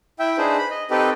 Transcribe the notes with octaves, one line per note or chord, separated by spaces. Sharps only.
E4 E5 G5
D4 D#4 G#4 B4 C5
B5
D#5
C4 D#4 G4 A4 B4 D#5